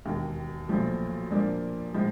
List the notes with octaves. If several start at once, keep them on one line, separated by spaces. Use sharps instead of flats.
E1 D#2 D#3
B1 A#2 F3 A3
A#2 F3 A#3 D4
A2 F3 G#3